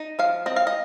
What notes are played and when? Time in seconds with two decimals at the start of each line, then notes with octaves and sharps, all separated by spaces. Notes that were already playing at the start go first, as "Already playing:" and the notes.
Already playing: D#4
0.19 F3 F5
0.46 C4 D#5
0.56 F5
0.67 D#5